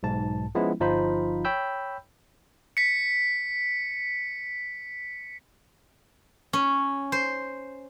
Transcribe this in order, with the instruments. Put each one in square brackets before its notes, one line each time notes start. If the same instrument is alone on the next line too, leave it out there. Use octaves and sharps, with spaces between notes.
[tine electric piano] B1 G#2 A5
F3 G#3 B3 C#4 E4
G1 F3 D#4 F4 C5 B5
C#5 G5 B5 E6 G6
[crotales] B6 C#7
[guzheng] C#4
C5